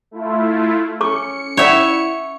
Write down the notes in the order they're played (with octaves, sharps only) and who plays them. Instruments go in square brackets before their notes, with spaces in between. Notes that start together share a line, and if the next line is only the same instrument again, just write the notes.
[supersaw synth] A3 E4 F4
[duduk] C#4 [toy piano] A4 C#6 D6 [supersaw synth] C#7
[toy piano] C#4 D5 F#5 [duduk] E4 [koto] C#5 E5